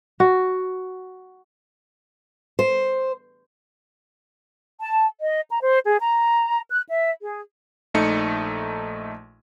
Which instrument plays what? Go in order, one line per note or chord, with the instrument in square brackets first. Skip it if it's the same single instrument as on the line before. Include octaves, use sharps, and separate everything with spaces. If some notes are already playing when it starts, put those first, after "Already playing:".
[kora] F#4
[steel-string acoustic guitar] C5
[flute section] A5
D#5
A#5
C5
G#4
A#5
F#6
E5
G#4
[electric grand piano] A#1 A3 D#4 C#7